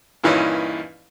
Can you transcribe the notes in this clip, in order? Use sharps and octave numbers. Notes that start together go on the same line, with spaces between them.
G2 A#2 E3 C#4 D#4 E4